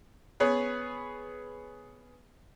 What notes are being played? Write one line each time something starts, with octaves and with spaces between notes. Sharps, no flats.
B3 C#4 G#4 B4 C#5